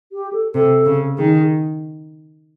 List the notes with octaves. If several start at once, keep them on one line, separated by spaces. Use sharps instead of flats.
G4
A4
C3 A4
C#3
D#3 G#4